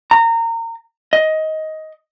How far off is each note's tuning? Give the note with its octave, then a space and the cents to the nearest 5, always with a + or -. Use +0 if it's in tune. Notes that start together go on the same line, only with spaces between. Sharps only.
A#5 -25
D#5 +15